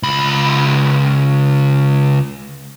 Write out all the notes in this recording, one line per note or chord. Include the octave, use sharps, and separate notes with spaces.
C#2 B5